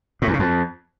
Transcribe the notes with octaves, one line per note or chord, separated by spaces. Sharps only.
A2
E2
C#3
F2